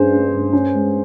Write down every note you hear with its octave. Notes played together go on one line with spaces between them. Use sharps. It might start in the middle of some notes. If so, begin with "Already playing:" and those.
Already playing: G2 C#4 G#4 C5
C#4
G2
C#4
G#3